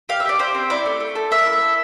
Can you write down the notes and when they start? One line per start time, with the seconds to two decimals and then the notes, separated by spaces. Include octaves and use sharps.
0.09 G4 F5
0.20 E5
0.25 G4 D5
0.39 G4 C5
0.54 C4
0.70 E4 D5
0.86 A3
1.00 A3
1.15 A4
1.31 A#3 E5
1.46 E4
1.62 A4